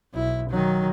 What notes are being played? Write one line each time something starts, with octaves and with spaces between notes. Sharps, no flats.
B1 E4
D#3 F#3